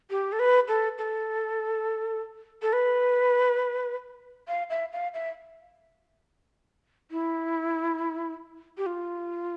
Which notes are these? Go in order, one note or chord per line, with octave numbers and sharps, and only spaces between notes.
G4
A4
B4
A4
A4
A4
B4
F5
E5
F5
E5
E4
G4
F4